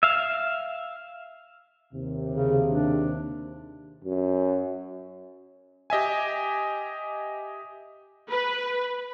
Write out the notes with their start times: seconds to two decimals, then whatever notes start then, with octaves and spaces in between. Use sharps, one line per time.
0.03 E5 F5
1.93 D#2 C3
2.30 C#3
2.68 D4
4.04 F#2
5.90 G4 D#5 E5 G#5
8.29 B4